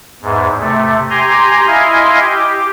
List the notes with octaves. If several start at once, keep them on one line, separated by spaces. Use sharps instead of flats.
E2 G#2
C3 A3
G4 G#5 A#5 C6
E4 D#5 F5 G#5 C6
G4